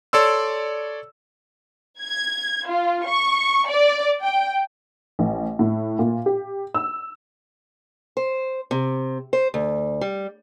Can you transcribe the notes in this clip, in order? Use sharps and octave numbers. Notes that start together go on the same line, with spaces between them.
A4 C#5 D5 C6 E6
G#6
F4
C#6
D5
G5
A1
A2
A#2
G4
E6
C5
C3
C5
D2
G3